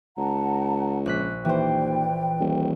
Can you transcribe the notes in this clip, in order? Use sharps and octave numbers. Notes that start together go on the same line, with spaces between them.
C#2 F#5 A5 A#5
A#1 F#6 B6
D#2 E3 B4 C5 D5 G5
D#1